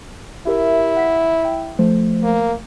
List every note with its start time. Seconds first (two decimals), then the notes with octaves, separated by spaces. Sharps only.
0.47 E4 G4 A#4 E5
0.97 F#5 B6
1.45 G5
1.79 F3 A3 C5
2.23 A#3